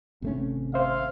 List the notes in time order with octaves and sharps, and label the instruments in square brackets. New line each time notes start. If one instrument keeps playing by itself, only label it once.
[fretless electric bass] G#1 A3 C#4 [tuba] C3
[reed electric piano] C5 E5 [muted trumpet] F5